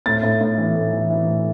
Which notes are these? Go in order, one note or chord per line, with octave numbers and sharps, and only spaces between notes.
A2 A6
A2
A2
E3
A2
E3
E3
A2